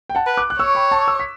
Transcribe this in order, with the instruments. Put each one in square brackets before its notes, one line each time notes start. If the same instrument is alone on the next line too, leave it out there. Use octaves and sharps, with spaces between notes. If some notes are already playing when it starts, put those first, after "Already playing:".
[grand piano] G5
F#5 A5
[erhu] B4
[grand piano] D6 F#6
F#6
[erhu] C#5 [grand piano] C#6 E6
[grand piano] G5 B5
A5 C#6
C#6 E6
B6